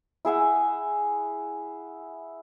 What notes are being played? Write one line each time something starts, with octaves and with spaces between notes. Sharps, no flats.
E4 G#4 E5 F#5